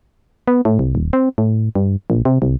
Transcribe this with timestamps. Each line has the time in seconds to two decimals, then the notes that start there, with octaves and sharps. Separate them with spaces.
0.48 B3
0.65 A2
0.79 C2
0.95 D#1
1.13 C4
1.38 A2
1.75 G2
2.10 A#1
2.25 C3
2.42 C2